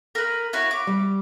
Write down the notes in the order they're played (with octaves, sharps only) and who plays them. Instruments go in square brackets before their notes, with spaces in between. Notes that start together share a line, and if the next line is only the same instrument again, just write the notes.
[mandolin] A#4 B4
E4 F#4 C#5
D6
[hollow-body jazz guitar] G3